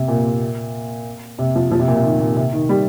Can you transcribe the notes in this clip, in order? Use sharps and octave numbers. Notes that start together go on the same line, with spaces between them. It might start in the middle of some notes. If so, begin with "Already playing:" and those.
Already playing: C3
A#2
C3
F3
F3
C3
A#2
C3
D#3
A#2
C3
D#3
G3